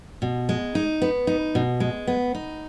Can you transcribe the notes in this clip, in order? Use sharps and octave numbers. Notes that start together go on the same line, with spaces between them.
B2
G#3
D#4
B3
D#4
B2
G#3
B3
D#4